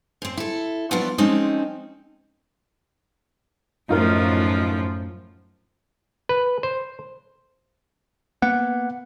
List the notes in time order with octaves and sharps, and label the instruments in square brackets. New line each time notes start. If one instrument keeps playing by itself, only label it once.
[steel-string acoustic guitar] F#2 C4
E4 A4
F3 F#3 B3 D4 E4 F4
F3 G#3 C4 C#4 D#4
[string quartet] F#2 A2 F3 [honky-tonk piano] D#4 F4 A#4
[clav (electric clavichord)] B4
C5
[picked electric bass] A#3 B3 [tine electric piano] F#5